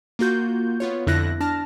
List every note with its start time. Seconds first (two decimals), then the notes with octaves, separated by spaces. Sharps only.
0.19 A#3 F4 F#4 G6
0.80 B3 F4 C#5
1.07 F2 D3 E4 F#6 A#6
1.40 D4 A5 F6 A#6